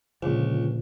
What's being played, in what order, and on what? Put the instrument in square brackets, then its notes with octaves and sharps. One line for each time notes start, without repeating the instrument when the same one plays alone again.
[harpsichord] C#2 [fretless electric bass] A#2 D3 F3